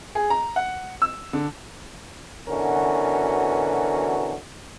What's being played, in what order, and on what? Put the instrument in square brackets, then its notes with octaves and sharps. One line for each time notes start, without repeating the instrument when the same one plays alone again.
[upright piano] G#4
A#5
F#5
E6
D3
[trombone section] B2 D3 E3 C#4 F#4 A#4